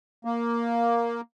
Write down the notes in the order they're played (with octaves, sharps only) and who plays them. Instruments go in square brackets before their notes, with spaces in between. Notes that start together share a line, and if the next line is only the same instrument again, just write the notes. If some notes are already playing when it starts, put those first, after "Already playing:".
[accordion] A#3